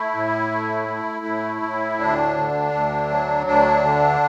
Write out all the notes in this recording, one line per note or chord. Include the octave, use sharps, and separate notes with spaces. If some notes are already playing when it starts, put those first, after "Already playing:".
Already playing: A3 E4
A2
A3
A3
A2
A2
D2 D4
D3
D2
F#3
D2 D4
D3